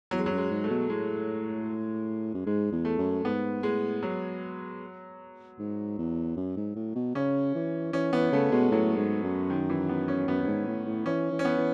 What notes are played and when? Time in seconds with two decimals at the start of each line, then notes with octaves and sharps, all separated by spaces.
0.11 E2 F#3
0.19 G#3
0.26 F#3
0.32 F#2
0.38 G#3
0.51 G#2
0.64 A3
0.70 B2
0.90 A2 G#3
2.34 F#2
2.46 G#2 G#3
2.72 E2
2.85 A3
2.98 F#2
3.24 G#2 B3
3.63 A2 G#3
4.03 F#3
5.59 G#2
5.98 E2
6.37 F#2
6.57 G#2
6.76 A2
6.95 B2
7.15 C#3 C#4
7.55 E3
7.93 E3 C#4
8.13 E3 B3
8.32 C#3 A3
8.52 B2 G#3
8.72 A2 F#3
8.97 G#2
9.24 F#2
9.50 D#3
9.70 E3
9.89 B3
10.08 C#4
10.28 F#2 B3
10.43 F#2
10.47 G#2
10.67 A2
10.86 A2
11.06 E3 C#4
11.32 E3
11.39 C#4
11.45 B3
11.58 E3